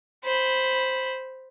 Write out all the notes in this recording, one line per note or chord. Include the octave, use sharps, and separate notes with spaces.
C5 B5